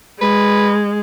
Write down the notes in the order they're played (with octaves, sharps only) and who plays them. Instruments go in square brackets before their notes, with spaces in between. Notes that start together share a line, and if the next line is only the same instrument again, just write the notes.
[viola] G#3 [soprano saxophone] B4